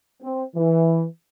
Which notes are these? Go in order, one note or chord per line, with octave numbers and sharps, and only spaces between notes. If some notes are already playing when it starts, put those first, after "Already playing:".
C4
E3